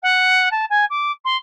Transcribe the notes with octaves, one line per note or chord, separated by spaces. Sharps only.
F#5
A5
G#5
D6
C6